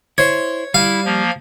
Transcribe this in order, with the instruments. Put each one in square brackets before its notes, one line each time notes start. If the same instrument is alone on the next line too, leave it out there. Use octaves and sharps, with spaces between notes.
[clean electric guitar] E4 C5 [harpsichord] C#5
[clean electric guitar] G3 [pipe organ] E4 [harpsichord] F5
[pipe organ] F3 A#3